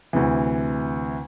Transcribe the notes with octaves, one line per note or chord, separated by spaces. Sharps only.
D2 C3 E3